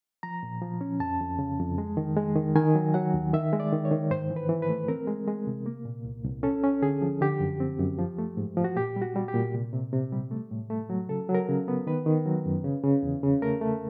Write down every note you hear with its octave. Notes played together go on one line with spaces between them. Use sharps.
F3 A#5
A#2
F3
C#4
F2 A5
F2
C#3
F2
G#3
D#3
G#3
D#3
D#3 G#5
F#3
F#3 F#5
D#2
D#3 E5
G#3
D5
D#3
C#5
D#3
G#2 C5
E3
B4
E3
B4
A3
C4 A#4
G#3
G#3
C3
A#3
A#2
C2
C2
C#4 A4
C#4
D3 G#4
F3
D3 G4
F#2
C4
F#2
F3
A3
G#2
F3
F#4
A#2 G4
G3
F#4
G3
G4
A#2
C3
C3
C3
G3
A3
A2
A3
F#3
C#3 A4
F#3
A#4
C#3
B3
D#3 B4
D#3
F#3
F#2
C#3
C#3
E2
C#3
A3 A#4
A3